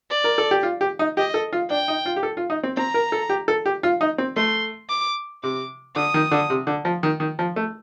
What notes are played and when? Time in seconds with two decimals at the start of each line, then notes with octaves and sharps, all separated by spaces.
0.10 D5
0.24 A#4
0.38 A4
0.51 G4
0.63 F4
0.81 G4
0.99 D#4
1.17 G4 D#5
1.34 A4
1.53 F4
1.70 D4 G5
1.88 D#4
2.06 F4
2.16 G4
2.23 A4
2.37 F4
2.50 D#4
2.63 C4
2.77 C4 A#5
2.94 A#4
3.12 A4
3.30 G4
3.48 A4
3.66 G4
3.83 F4
4.01 D#4
4.18 C4
4.36 A3 C6
4.89 D6
5.43 C3 D6
5.96 D3 D#6
6.14 D#3
6.31 D3
6.50 C3
6.67 D3
6.85 F3
7.03 D#3
7.20 D#3
7.39 F3
7.56 A3